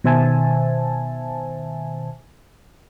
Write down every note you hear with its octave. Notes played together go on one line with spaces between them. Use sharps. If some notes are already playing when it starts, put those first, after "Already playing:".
B2 D#3 C5 E5 G#5 A5